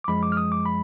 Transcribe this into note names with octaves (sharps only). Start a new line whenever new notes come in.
D6
F#2 F3 G#3 B5
D6
F6
D#6
D6
B5